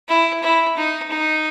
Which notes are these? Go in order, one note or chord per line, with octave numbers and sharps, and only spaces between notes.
E4
E4
D#4
D#4